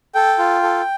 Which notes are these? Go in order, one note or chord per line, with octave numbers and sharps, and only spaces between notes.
A4 G5
F4
A4